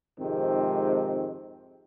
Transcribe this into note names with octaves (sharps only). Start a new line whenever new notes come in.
F2 G#2 C3 D#3 G#3 C4